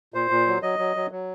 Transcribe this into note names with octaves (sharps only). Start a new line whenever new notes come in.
A#2 C5
A#2
F#3
F#3 D#5
F#3
F#3
F#3